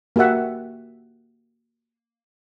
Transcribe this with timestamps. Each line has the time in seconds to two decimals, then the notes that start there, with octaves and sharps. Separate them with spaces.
0.16 A#3 F#4 G4 E5 F#5